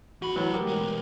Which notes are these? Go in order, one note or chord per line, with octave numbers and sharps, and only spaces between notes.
E2 F#4 B5
E3 F#3 A3 F#5
G4 A#4
E3 G#3